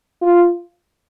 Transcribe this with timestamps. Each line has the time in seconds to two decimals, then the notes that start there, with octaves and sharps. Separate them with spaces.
0.22 F4